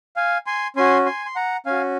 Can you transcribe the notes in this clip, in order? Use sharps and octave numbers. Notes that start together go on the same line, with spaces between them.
F5 G#5
G#5 C6
C#4 F#4 G#5 C6
G#5 C6
C6
F#5 A#5
C#4 F#4 F5 G#5